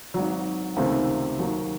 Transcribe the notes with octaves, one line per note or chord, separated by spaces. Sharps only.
G#1 G#2 F#3
C#2 C3 D#3 A3 C4
D#2 D#3 F#3